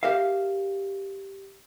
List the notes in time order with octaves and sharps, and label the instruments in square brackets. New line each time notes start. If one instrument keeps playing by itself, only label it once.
[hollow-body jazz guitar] G4 A#4 E5 F5